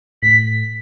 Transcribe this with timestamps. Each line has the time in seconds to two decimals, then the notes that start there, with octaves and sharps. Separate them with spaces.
0.22 A2 B6